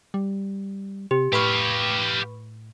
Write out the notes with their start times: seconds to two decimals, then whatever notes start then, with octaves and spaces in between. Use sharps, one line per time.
0.14 G3
1.11 C3 G4
1.33 A2 G4 B4 F5 B5 C#6